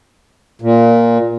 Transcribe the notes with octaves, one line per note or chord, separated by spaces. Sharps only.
A#2